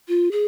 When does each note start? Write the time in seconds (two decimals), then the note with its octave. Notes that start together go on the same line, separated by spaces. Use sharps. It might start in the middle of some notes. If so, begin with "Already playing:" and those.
0.08 F4
0.32 G#4